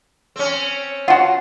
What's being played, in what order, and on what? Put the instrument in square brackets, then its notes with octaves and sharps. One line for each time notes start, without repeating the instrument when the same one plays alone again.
[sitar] C4 C#4
[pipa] F4 F#4 [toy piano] F#5 G#5 A5